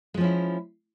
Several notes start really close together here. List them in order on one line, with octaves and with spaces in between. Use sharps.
G#3 F3 C#4 E4